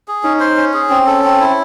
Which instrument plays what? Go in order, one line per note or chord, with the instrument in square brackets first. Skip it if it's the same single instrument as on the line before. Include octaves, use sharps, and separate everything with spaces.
[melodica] G#4
[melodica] C#4 [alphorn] D#4
[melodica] C5
C#4
G#4
[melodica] C4 [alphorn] C#4
[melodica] A4
C4
E4